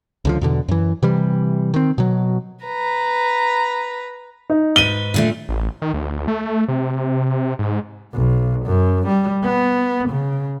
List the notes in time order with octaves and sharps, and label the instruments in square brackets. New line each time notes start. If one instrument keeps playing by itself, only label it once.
[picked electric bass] C#2 D3 F3
E2 B2 D3
F#2 E3
C3 E3 G3
D#3 C4
B2 F#3
[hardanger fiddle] B4 A#5
[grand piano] D#4
[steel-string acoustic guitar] G#2 B4 [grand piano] D#7 G7
[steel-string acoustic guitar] A#2 D3 A3
[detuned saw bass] A1
D#3
D2
A3
C3
G#2
[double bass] B1
F#2
G3
B3
C#3